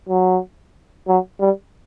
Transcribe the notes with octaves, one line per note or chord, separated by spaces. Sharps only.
F#3
F#3
G3